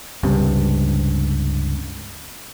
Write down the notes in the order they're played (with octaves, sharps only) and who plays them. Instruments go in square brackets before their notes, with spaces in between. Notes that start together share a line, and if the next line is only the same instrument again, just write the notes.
[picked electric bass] C#2 G2 C3